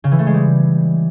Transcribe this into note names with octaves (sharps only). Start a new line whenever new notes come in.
C#3
E3
A3
G#3
G3